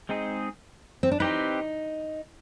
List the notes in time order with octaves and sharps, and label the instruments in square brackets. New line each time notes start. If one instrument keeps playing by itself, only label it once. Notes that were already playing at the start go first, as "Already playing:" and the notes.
[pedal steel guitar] G#3 C4 D#4 G#4
[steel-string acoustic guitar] C4
D4
[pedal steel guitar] C4 G4 B4 [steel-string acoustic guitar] D#4